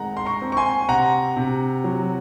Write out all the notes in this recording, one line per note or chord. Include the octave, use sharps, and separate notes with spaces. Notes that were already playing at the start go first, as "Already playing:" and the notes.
Already playing: D#3 G#3 C4 F#5 A#5
C6
A#5 C#6
C4
C#6
G#5 C6
C3 F#5 A#5
C3
F#3